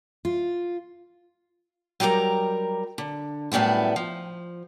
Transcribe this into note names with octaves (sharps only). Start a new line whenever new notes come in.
F4
F#3 G3 G4 A#4 A#5
D3
F#2 A2 G3 B3 E4
F3